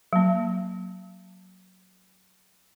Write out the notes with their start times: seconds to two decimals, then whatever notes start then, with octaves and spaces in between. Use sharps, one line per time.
0.13 F#3 A#3